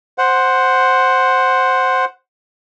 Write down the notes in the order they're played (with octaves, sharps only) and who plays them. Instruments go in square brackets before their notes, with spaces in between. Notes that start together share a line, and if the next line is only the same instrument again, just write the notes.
[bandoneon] C5 F#5